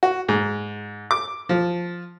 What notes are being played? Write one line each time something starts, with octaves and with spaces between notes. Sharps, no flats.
F#4
G#2
D6
F3